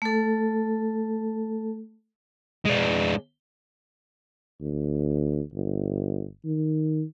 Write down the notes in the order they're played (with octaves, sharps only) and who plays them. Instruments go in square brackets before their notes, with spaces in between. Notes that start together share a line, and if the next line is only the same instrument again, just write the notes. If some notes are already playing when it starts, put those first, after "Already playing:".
[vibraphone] A3 A4
[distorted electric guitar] G#3 D4
[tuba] D2
G1
D#3